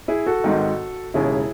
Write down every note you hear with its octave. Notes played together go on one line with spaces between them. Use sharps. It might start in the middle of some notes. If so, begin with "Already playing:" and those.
E4 G#4
F#4 A4
G#1 G#2 D#3
E1 D#2 C#3 G#3 E4 G#4